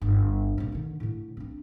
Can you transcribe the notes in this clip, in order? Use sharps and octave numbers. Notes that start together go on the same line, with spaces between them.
G1 G3
A#1 C4
D3 D#3
A2 D3
C4 D4